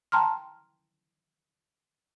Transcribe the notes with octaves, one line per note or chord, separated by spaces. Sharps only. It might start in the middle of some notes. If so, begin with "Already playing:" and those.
G5 A5 A#5 C6 F6